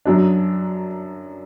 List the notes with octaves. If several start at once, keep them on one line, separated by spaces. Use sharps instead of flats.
F#2 F#3 D4